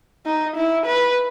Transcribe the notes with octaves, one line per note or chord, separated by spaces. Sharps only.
D#4
E4
B4